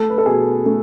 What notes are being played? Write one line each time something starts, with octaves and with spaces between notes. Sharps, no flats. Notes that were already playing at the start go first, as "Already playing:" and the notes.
Already playing: A3 A4
B4
A4
B2 G#4
A3